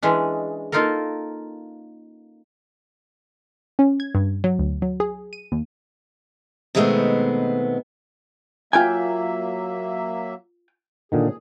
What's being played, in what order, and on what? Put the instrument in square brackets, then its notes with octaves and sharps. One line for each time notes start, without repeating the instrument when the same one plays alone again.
[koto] E3 G#3 C#4 D4
A#3 D#4 F4 A4 A#4
[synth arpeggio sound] C#4
G#6
G2
F#3
D2
F#3
G#4
D#7
D#2
[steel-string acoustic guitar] B2 D#3 G#3 A3 B3 C4
[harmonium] F#3 A#3 E5 [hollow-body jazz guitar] F4 G5 G#5
[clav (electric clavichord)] A#2 D3 D#3 [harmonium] G#4